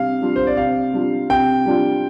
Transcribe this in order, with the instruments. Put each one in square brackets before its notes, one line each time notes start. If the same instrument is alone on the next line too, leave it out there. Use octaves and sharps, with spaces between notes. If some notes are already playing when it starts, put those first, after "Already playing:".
Already playing: [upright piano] C3 G3 D4 [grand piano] F5
[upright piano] G3 D4 F4
[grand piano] C5
D5
[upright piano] C3 [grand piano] F5
[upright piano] G3 D4 F4
[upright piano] C3 [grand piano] G5
[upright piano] G3 D4 F4